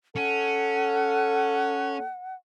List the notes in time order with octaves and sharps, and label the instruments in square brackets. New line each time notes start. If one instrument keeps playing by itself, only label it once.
[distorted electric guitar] C#4 [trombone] A4 [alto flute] F#5